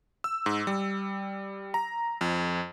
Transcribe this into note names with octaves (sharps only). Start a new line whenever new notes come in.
E6
G#2
G3
A#5
F2